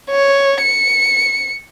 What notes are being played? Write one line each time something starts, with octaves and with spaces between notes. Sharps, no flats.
C#5
C#7